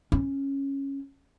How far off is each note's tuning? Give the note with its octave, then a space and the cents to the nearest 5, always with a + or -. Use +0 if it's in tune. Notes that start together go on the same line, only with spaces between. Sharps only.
C#4 -10